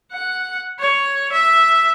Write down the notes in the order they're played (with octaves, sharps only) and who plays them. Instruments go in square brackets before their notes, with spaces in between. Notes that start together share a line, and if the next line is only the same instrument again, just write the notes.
[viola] F#5
C#5
E5